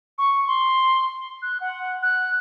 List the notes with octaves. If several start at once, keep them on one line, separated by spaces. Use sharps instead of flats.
C#6
C6
F#6
F#5
F#6